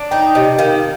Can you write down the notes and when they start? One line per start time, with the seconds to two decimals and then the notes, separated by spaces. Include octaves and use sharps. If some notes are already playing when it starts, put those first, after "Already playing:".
Already playing: D4
0.11 D#4 G5
0.35 C3 D#5
0.59 D#3 F5